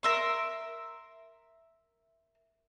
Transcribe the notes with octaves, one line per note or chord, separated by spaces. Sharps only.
A#4 E5 C6